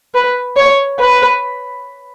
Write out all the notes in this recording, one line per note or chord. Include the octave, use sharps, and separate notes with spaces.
B4
C#5
B4